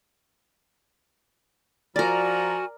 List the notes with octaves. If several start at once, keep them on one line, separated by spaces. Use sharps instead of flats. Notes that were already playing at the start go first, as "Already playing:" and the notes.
F3 F#4 A#4 D5 G#5 A#5 F6